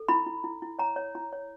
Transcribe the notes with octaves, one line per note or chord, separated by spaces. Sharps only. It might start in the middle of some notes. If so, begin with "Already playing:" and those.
Already playing: A4
E4 B5
E4
E4
E4
C#5 A#5
C#5
E4 A#5
C#5